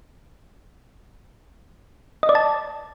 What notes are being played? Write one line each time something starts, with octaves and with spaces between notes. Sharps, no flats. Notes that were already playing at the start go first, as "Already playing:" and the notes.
D#5
D5
A5